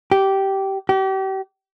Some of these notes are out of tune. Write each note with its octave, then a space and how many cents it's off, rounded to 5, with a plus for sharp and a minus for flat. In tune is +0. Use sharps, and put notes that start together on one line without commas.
G4 -15
G4 -35